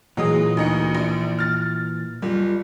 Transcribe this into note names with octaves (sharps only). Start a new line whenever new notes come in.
A#2 E3 F#3 G#3 D#6
D2 D#4 C#7
A#1
F6 A6
F#1 G3 F4